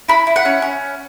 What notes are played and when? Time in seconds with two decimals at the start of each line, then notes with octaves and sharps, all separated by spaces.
0.08 E4 B5
0.27 E4
0.36 F#5
0.45 C#4
0.62 C#4